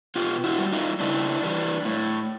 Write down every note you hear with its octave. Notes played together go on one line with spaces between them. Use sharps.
B2 F4 G4
E4 F#4
G3
D#4 F4
C#3 D4 E4
E3 G3
A2